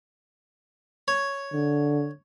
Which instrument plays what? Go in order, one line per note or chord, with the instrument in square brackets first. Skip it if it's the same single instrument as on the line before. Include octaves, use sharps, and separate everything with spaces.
[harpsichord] C#5
[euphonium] D3